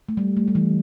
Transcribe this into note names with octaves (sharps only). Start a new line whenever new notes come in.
A3
G3
A3
G3
E3